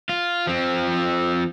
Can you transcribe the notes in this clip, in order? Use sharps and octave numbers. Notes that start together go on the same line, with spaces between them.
F4
F3 C4